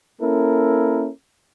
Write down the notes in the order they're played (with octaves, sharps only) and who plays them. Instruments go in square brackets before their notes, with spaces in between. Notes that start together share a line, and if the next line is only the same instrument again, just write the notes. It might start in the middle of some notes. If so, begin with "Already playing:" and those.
[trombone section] A#3 C#4 E4 A4 A#4